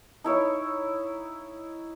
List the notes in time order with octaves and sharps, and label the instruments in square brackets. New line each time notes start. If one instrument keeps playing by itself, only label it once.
[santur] D#4 E4 C#5